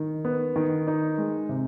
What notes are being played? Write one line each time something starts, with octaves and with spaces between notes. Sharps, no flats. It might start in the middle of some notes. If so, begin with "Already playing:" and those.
Already playing: D#3
B3
D#3
D#4
G#3
C3